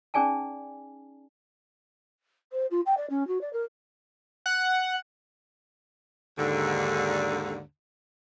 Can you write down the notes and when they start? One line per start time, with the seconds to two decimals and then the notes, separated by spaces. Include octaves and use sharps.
0.14 C#4 D#4 G#4 D5 G#5 A5
2.52 C5
2.70 F4
2.86 G5
2.97 D5
3.10 C#4
3.27 F#4
3.41 D5
3.52 A#4
4.46 F#5
6.37 D#2 G#2 D3